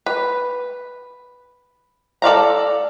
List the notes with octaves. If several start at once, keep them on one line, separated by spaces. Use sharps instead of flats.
B4
A4 D5 F5 A#5